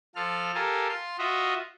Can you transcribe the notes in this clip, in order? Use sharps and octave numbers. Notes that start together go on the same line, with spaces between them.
F3 F4 A4 F6
G4 A4 A#4 F5 G#5
F4 C6
F4 F#4 D#5 E5